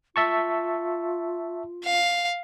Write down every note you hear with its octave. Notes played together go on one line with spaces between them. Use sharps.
F4 E5 A5 C#6
F5